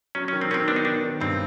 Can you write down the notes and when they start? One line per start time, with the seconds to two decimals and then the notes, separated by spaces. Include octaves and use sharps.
0.15 F#3 C#4
0.28 D#3 C#4
0.41 C4
0.50 D#3 C#4
0.54 C4
0.68 B3 D4
0.76 D#4
0.85 D#3 D4
1.04 D#3
1.20 G2 C4